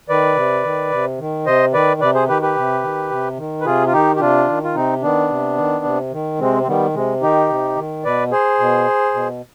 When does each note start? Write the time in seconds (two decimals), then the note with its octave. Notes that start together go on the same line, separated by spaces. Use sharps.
0.09 D#3 B4 D5
0.36 C3
0.64 D#3
0.92 C3
1.19 D#3
1.46 C3 C5 D#5
1.74 D#3 B4 D5
2.01 C3 B4 D5
2.14 G#4 C5
2.28 D#3 G4 B4
2.42 G4 B4
2.56 C3
2.83 D#3
3.11 C3
3.38 D#3
3.61 B4
3.66 C3 F4 G#4
3.87 F4
3.93 D#3 D#4 G4
4.16 G4
4.20 C3 D4 F4
4.48 D#3
4.64 F4
4.75 C3 C4 D#4
5.03 D#3 B3 D4
5.30 C3
5.58 D#3
5.85 C3
6.12 D#3
6.40 C3 G#3 C4
6.63 C4
6.68 D#3 G3 B3
6.95 C3 G#3
7.22 D#3 D#4 G4
7.50 C3
7.77 D#3
8.04 B2 B4 D5
8.32 G#4 C5
8.59 B2
9.14 B2